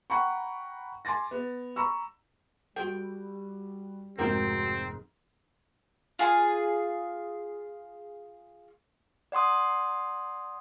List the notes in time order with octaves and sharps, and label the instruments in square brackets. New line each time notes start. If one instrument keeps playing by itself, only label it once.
[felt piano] F#5 G5 A#5 B5 C#6
G#5 C6 D6 A6 A#6
B3
A#5 B5 C#6 E6
[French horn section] G3 [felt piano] F#4 A4 [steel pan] G5
[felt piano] F1 G#2 C3 [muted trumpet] C4 [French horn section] F#4 [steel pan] A#4 G5
[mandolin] F4 G#4
[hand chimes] D5 F#5 C6 D#6